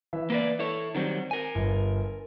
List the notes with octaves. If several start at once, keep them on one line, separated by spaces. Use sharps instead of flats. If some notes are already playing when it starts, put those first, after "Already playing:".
E3 E5
A#3 B4 D5
E4 A4 C#5
D#3 F#3 G3 C4
A#4 G#5
G1